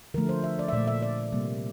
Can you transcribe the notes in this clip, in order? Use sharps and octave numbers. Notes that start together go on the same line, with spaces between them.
D3 F3 A3 A#4
C5
E5
D5
E5
A#2 A3 D5
E5
D5
C3 G3 A#3